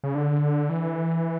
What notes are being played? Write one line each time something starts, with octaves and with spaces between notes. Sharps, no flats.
C#3
D3
E3